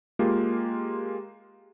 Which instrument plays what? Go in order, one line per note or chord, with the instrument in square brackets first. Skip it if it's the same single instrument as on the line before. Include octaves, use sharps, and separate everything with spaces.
[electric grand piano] G#3 A#3 F4 G4